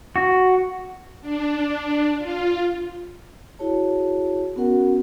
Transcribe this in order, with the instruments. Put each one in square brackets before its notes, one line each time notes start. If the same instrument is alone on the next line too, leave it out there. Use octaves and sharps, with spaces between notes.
[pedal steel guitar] F#4
[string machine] D4
F4
[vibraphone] E4 F#4 G#4 C#5 A5
B3 C#4 F#4 A#4 F#5